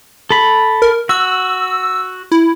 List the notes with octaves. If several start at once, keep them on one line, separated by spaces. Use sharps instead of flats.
A4 B5
A#4
F#4 E6
E4